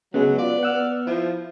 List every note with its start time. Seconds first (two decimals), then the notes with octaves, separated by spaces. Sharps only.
0.14 C#3 F#3 G#3 B3
0.38 F4 D5
0.63 F#5 E6 F6
1.07 F3 E4